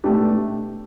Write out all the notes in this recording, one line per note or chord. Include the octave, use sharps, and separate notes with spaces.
B2 A3 D4 G4